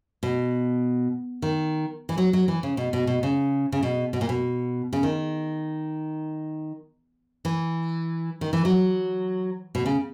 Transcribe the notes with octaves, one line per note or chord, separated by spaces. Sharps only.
B2
D#3
E3
F#3
F#3
E3
C#3
B2
B2
B2
C#3
C#3
B2
B2
A#2
B2
C#3
D#3
E3
D#3
E3
F#3
B2
C#3